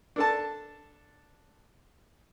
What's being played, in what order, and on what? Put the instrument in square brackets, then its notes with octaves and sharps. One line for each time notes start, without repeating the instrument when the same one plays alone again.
[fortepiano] D4 A4 A5